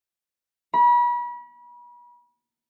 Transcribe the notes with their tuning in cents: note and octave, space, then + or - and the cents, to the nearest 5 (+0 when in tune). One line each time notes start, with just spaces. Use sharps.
B5 -35